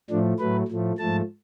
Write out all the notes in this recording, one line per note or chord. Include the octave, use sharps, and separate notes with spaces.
A2 F3 A3 D4
A2 F#3 A3 B4
A2 F3 A3
G#2 F3 A3 A5